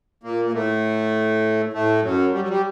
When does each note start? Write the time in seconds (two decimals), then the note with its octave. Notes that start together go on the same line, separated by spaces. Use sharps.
0.23 A#2 A#3
0.45 A#3
0.53 A2 A3
1.73 A2 A3
2.02 F#2 F#3
2.33 G3
2.41 F#3
2.48 G3